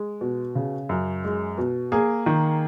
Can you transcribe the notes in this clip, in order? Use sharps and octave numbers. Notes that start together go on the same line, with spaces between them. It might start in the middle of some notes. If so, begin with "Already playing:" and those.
Already playing: G#3
B2
C#3
F#2
G#3
B2
A#3 G#4
D#3